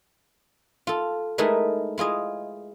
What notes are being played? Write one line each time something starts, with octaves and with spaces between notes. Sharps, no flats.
F4 A4
G#3 A3 D#4 E4 A#4 B4
E4 F4 G#4 D#5